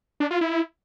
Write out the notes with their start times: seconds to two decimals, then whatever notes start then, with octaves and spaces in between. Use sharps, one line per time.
0.20 D4
0.31 F4
0.41 E4